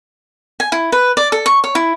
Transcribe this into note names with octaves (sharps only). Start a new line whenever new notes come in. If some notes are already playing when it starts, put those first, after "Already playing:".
G#5
E4
B4
D5
A4
C#6
C#5
E4